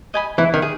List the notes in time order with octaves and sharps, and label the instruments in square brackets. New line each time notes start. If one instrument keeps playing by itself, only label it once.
[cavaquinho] D#5 G#5 B5
[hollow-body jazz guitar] E3 [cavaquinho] E4
[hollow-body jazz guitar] D#3
[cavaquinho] G#4